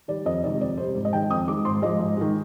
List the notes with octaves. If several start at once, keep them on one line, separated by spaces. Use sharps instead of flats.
D#3 G3 D5
F2 D#5
C3 D#3 G#3 D5
F2 D5
C3 G3 C5
G#2
D#5
D#3 G#3 G5
F2 D#6
D#3 G#3 D6
G#2 C6
F3 G#3 D#5
G#2
D#3 G#3